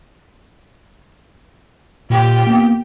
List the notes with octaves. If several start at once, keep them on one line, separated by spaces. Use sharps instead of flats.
A#2 F4 G4
A#3 B3